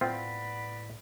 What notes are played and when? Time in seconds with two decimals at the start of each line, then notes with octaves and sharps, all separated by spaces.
0.01 A2 B3 C4 F4 D5 B5